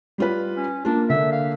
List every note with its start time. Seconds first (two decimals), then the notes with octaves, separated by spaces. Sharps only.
0.18 G3 F4 B4
0.57 C#4
0.85 A#3 D4 F4
1.10 D3 A#3 E5
1.32 F5